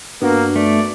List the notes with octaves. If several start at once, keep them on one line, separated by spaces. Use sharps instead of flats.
G2 A#3 B3 D4 F#4
A3 D5